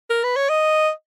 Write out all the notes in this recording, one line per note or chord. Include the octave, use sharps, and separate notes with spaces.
A#4
B4
C#5
D#5